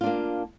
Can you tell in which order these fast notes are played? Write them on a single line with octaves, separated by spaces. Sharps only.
F4 D4 A#3